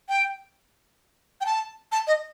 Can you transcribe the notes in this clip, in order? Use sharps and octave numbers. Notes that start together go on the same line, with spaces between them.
G5
G5
A5
A5
D#5